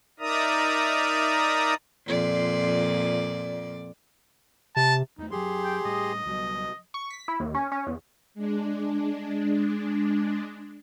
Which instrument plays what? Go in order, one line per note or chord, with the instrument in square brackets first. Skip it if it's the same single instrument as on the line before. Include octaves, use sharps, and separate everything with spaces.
[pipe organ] D#4 A#4 D5 E5 A#5 D#6
[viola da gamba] F2 A#2 D5
[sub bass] C3 [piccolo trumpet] A5
[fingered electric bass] E2 A3 [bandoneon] D#4
[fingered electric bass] F#2 F#3 [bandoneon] G4 G#4 C6
[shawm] G5
[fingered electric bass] A2 G3 [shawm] D#5
[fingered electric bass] C#2 F#3 G3 [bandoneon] B2
[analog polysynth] C#6
B6
E4
D#2
C#4
C#4
E2
[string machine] G#3 D4